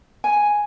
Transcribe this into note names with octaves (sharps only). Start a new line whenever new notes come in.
G#5